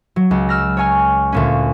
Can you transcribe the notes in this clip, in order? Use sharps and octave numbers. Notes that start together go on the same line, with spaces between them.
F#3
C#2
E6 F6 A#6
C#5 G#5 F6
D2 A#2 C#4